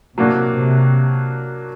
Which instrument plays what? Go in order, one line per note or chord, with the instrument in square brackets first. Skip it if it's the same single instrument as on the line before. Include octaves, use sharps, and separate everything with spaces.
[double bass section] C3 [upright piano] F#3 A#3 D4 F#4
[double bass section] C3